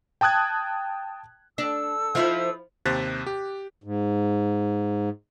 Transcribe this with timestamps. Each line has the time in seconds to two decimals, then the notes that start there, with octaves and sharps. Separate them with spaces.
0.21 G5 A5 D#6 F#6 G#6
1.58 D4 A4 E6
2.15 F3 D#4 E4
2.86 D#2 C3 C5 F#6 A6 B6
3.27 G4
3.84 G#2